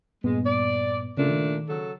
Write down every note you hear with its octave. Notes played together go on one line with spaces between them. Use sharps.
G2 A#2 G#3 B3
D5
A#2 C#3 A3 D4
D#3
C#3 F#3 A4